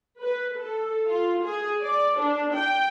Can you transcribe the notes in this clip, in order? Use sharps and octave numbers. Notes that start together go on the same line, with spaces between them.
B4
A4
F4
G#4
D5
D4
G5